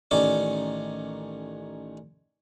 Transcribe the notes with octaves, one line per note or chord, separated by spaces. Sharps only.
A1 D#3 C#4 D5 D6